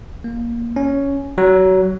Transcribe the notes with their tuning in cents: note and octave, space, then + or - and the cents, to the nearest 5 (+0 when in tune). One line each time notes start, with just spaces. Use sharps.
A#3 +10
C#4 +5
F#3 +25